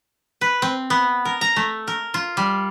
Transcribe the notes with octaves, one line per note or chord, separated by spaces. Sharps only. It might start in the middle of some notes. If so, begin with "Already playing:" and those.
B4
C4
B3
A#4
A#5
A3
A#4
F4
G3